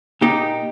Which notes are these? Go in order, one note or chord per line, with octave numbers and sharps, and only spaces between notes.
A#2 D#4 G4